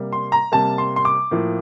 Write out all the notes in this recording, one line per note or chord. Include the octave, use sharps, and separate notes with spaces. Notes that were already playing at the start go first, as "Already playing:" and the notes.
Already playing: C3 G3 A#3
C6
A#5
C3 G3 A#3 A5
C6
C6
D6
A2 F3 A#3